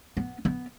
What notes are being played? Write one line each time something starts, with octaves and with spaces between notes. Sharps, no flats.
B3
B3